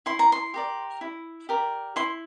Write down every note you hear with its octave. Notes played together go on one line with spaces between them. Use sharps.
E4 C6
A#5
C6
G4 A#4 D5
E4
G4 A#4 D5
E4 C6